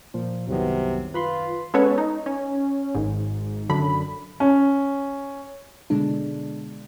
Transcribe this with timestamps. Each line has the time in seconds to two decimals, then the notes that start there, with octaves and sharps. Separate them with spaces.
0.14 A#2 F3
0.48 C2 F#2 C3 D#3 F#3 B3
1.14 F4 B4 B5 C6
1.74 G#3 B3 C#4 A4 B4 C#5
1.98 D#4
2.26 C#4
2.95 G#1 G#2
3.70 F#2 D3 B5
4.40 C#4
5.90 B2 D3 G#3 D4